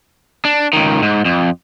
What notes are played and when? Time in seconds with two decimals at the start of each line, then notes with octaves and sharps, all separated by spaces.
0.45 D4
0.73 C#2 D#3
1.03 G#2
1.25 F2